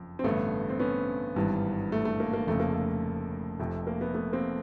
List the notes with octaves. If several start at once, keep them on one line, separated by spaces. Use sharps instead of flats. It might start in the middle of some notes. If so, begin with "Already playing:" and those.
Already playing: F#1 F2 F3
C4
A1 G2 D3 A3 B3
C4
B3 C#4
G#1 G2 E3 G3
A3
A3
A#3
A#3
F1 F2 C#3 A3
A#3
A3
F1 F2 C3 A3
A#3
A3 B3
A3 B3
A#3 C4